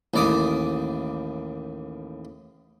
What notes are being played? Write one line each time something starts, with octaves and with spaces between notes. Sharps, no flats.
A1 D#2 D5 D6 D#6